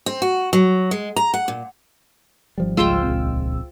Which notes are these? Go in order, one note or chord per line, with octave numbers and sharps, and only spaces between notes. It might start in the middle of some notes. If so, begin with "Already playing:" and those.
C4
F#4
F#3
G#3
A#5
F#5
A#2
G#1 F3 G3
C#2 G#3 F4 C5 G5 E6
D#1 A#1 C4